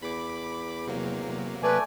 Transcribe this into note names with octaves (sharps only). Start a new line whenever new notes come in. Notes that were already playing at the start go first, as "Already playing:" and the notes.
E2 B5 D6
C3 F#3 A#3
A3 B4 D5 G#5